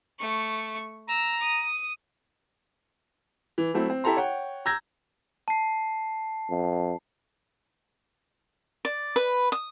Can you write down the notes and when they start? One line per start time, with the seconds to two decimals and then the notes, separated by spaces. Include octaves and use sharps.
0.19 A3 C#6
1.09 A#5 E6
1.41 D#6
3.58 E3
3.74 F#3 A3 C4 E4
3.90 C4
4.04 E4 G4 A4 A#5 C6
4.17 C#5 F#5 G5
4.66 A#5 E6 G6 G#6 A#6
5.48 A5 C7
6.50 F2
8.85 D5
9.16 B4
9.52 D#6